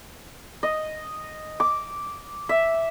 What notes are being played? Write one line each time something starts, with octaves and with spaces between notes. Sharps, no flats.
D#5
D6
E5